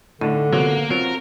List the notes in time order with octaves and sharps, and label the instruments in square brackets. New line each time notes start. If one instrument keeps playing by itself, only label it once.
[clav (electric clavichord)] A2 [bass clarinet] D3 [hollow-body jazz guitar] A3 D4 D#4
[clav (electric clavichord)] C3 F3 F#3 [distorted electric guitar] A#3 [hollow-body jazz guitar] B3
[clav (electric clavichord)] F#3 [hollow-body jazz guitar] C4 F4 F#4 [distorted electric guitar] A#4